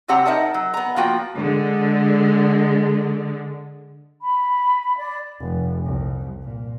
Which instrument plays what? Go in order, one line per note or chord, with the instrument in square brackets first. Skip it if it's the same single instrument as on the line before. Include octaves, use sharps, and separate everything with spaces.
[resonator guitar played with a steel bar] C3 F#3 C4 G4 F#5 A#5
D#4 A#4 D#5 E5 F#5 A5
F#3
B3 A#5
F3 A#3 F4 F#4 G5
[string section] D3 G#3
[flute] B5
D5
[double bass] F1
C2
A#2